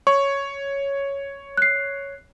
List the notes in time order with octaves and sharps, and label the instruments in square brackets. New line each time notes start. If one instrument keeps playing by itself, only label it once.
[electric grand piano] C#5 [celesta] C#6
[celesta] F#6 C7